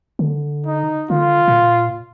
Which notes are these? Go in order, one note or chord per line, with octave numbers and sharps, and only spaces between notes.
D3
D#4
D3 F4
A#2